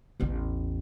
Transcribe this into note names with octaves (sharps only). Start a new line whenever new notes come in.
A1 E2